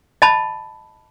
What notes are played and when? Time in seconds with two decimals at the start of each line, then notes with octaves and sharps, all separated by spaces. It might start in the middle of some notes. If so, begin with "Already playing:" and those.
0.22 D#5 A5 B5